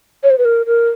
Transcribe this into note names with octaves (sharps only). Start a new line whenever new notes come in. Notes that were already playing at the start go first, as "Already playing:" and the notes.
C#5
C5
B4
A#4
A#4